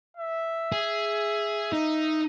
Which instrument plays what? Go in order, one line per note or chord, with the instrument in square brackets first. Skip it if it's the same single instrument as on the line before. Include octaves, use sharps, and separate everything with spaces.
[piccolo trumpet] E5
[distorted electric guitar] G#4
D#4